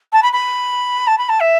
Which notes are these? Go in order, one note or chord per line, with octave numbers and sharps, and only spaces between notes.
A5
B5
B5
A5
B5
A5
E5